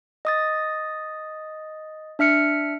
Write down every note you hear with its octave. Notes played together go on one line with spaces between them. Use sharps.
D#5 D#6 A6
D4 E5 F6 C#7